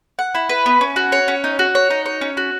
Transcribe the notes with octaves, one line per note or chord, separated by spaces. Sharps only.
F#5
E4
B4
B3
C#4
F#4
C#5
C#4
D#4
F#4
C#5
D#4
C#5
C#4
F#4